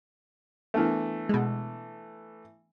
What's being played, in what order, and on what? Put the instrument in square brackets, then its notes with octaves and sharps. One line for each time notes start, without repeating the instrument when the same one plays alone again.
[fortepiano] E3 A3 [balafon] B3 D4 A#4
[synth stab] B2 G#3